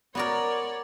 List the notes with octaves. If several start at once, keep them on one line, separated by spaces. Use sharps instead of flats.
B3 F#4 A#4 C#5 D5